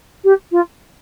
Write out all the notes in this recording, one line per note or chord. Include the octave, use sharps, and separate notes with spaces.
G4
F4